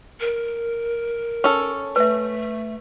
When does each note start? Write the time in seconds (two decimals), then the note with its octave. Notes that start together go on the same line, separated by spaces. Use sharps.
0.20 A#4
1.44 C#4 A4
1.96 A3 B4 E5